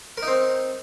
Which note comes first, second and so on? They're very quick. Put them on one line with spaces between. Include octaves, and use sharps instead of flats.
A#4 D#4 C4